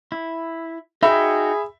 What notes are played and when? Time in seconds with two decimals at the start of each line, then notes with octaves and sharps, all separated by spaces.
0.12 E4
1.03 D#4 F#4 G#4 E5 G5 B5